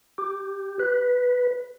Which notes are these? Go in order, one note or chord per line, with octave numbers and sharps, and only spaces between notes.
G4
B4